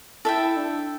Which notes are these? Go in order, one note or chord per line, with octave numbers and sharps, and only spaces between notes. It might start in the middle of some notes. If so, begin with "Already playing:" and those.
E4 A4 E5 G5
D4